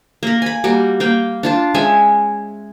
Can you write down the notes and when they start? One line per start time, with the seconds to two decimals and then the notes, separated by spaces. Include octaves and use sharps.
0.23 A#3 A#4
0.42 G#5 B5
0.64 G3 A#3 F#4
1.00 A#3 F5 G5
1.43 D4 F4 A5
1.74 G#3 C#4 E5 G#5